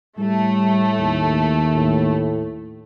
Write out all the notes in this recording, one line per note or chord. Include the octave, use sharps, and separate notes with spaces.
A2 G3 A3
D#2
A2